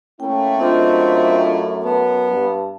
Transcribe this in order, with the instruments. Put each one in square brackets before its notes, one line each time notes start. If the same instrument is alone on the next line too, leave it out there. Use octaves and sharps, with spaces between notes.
[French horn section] A3 A#3 E4 [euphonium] C#4 [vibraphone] G5
[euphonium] F#2 [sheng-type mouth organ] C4 [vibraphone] D4 F4 D#5
[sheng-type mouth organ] B3 [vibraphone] A5
[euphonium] G2